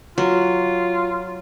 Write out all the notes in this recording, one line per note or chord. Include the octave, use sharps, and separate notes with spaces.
F#3 F4